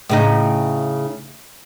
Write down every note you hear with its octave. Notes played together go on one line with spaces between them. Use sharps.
A2 C#3 D#4